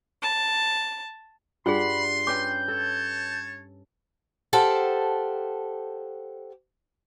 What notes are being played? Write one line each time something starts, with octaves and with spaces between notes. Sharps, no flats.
A5
G2 F4 G#4 D5 F#5 B5 C6
C#4 B4 G5 D6 G6
A4 C#5 A5
G4 A4 C5 F5 F#5 A5